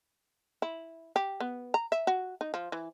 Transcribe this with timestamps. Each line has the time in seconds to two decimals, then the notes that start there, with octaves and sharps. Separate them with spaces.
0.62 E4
1.16 G4
1.40 B3
1.74 A#5
1.92 E5
2.07 F#4
2.41 D#4
2.54 F3
2.72 E3